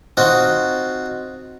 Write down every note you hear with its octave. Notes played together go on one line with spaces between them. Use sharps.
C4 D#4 F4 F#4